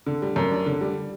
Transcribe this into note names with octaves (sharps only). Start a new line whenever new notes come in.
D3
G3
F#2
D4
D3
G3